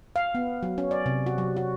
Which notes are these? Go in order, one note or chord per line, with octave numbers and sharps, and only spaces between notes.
F5
B3
F#3
C#4
D5
C3
F#4
F#3
F#4